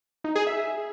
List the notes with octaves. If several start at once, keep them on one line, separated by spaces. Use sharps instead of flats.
D#4
G#4
E5